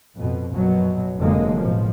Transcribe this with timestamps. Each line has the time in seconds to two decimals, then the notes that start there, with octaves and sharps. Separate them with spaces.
0.15 F2 B2
0.53 A#1 F#2 B2 F#3
1.18 F1 F2 D3 F#3 G#3 A#3
1.56 A1 B2 F3